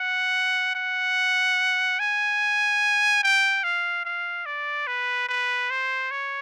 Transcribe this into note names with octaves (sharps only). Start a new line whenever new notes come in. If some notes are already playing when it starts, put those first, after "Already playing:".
Already playing: F#5
F#5
G#5
G5
F5
F5
D5
B4
B4
C5
C#5